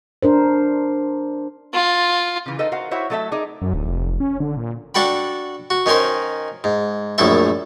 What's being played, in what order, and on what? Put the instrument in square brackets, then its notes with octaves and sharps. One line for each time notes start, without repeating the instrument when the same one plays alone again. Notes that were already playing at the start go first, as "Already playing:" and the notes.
[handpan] D4 A#4 C5
[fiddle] F4
[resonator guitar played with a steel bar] C#3 E3
D#4 A4 B4 D#5 G5
F#4 A#4 C5 F5 F#5
E4 F#4 C5 C#5 E5 F#5
F#3 A3 A4 C#5 E5
D#4 G#4 A#4 D5
[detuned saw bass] F#2
D1
F1
C#4
D3
A#2
[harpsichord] D4 F#4 A4 G5 B5
F#4
D#3 C#4 D#4 A#4 C5
G#2
A#1 F#2 A2 A4 E5